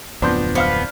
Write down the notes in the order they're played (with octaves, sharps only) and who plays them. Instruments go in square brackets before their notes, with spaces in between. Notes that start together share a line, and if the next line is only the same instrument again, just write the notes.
[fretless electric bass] D1 F2 C4 [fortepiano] F3 D4 [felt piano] B3 C6 G6
[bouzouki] B3 [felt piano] C5 F5 F6